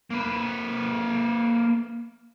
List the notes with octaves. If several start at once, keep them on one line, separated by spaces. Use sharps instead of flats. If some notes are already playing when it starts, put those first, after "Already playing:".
A#3 B4